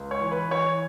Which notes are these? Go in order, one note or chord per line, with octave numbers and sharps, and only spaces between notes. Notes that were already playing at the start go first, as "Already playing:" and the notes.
Already playing: C#2
C#5
E3
B4
E3 C#5